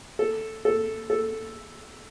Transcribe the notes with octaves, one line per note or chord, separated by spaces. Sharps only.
A4
A4
A4